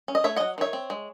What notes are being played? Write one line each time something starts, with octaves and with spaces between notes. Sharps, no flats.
C#4
D#5
A3 C#5 E5
F#3 D#5 F#5
D#3 C#5 E5
C4
G#3